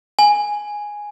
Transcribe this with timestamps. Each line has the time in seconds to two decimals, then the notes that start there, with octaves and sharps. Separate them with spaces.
0.19 G#5